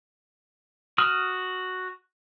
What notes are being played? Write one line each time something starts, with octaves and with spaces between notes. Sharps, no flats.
F#4 D#6 F6